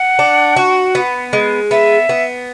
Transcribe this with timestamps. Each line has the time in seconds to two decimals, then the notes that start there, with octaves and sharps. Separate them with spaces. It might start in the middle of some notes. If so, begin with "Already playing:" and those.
Already playing: F#5
0.19 D4
0.56 F#4
0.95 B3
1.33 G#3
1.71 B3 E5
2.09 B3